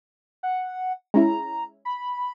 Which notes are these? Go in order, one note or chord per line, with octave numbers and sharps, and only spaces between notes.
F#5
G#3 C#4 E4 A#5
B5